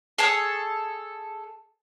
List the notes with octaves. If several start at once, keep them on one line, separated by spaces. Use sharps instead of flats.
G#4 A4 C#5 D#6